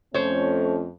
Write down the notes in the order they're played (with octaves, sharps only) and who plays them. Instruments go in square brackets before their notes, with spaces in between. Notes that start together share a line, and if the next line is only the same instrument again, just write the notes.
[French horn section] F2 A3 C#4 [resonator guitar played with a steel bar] C5 C#5